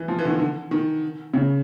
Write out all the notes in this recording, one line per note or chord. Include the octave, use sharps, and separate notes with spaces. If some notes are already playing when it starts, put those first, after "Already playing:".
Already playing: E3
F3
E3
D3
D#3
D3
D#3
C#3